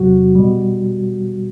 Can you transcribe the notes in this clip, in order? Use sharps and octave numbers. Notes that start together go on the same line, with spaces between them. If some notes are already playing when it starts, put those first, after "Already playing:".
Already playing: E2 C3 F#3 F#4
B2 G3